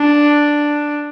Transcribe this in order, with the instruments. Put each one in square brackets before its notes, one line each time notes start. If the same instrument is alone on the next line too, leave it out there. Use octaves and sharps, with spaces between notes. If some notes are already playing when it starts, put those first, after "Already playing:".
Already playing: [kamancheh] D4